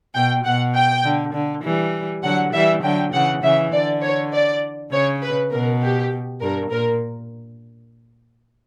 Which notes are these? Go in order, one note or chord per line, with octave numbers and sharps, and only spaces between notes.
B2 G5
B2 F#5
G5
D3
D3
E3 G3
D3 F#3 F#5
E3 G3 E5
D3 F#3 G5
C#3 E3 F#5
C#3 E3 E5
D3 D5
C#5
D5
C#3 C#5
B4
B2 A#4
G4
G2 A#4
A#2 A#4